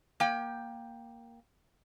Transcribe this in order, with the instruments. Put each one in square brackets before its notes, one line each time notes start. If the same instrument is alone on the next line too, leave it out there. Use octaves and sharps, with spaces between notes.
[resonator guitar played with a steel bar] A#3 G5